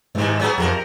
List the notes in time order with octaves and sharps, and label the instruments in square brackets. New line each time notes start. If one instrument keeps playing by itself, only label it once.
[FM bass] G#2 [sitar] C3 D#3
[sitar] F#3 B3 G#4
[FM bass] F2 [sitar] C3 A4 A#4